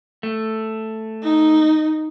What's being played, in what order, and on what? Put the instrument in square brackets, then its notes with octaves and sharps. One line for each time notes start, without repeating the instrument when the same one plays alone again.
[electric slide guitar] A3
[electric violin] D#4